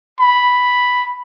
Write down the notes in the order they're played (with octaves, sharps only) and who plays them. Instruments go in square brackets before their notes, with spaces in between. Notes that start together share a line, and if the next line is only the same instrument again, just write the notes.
[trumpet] B5